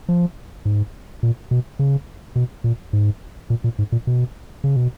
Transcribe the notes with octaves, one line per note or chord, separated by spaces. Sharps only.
F3
G#2
A#2
B2
C#3
B2
A#2
G#2
A#2
A#2
G#2
A#2
B2
C#3
B2